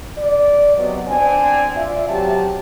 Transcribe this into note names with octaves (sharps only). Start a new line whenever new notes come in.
D5
C3 F#3 B3 D5 D#5
C4 D4 D5 G#5
F4 D5 E5
C3 F#3 G4 G5 A5